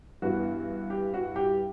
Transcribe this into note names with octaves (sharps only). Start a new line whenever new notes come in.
G2 E3 B3 F#4
G4
F#4
G4